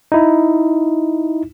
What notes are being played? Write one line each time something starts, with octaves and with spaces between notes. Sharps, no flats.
D#4 E4